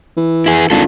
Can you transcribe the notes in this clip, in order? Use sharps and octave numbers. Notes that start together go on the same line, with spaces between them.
E3
E4 G#4
G#1 D4 F4 A4